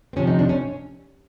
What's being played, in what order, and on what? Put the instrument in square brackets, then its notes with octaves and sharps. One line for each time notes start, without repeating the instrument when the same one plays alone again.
[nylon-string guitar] C4
D2 C3 F3 C#4
D#4
D4
C#4